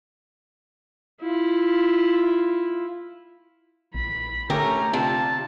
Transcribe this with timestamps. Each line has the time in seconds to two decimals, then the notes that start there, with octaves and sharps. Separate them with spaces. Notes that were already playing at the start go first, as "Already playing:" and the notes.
1.22 E4 F4
3.95 A#1 B5
4.50 D3 A3 C#4 G4 A#4 A#5
4.93 C3 D4 F4 A5